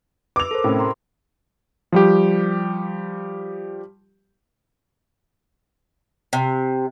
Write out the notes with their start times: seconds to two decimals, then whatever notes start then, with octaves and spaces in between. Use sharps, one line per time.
0.36 B4 D6 E6 F7
0.51 A4 A#4 C5
0.64 A2 C3 C#4
0.79 A#5 C6
1.92 F3 G3 G4
6.33 C3